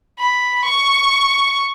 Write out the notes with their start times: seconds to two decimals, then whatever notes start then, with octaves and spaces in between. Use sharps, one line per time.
0.19 B5
0.64 C#6